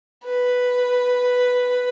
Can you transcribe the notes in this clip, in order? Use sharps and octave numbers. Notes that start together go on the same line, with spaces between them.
B4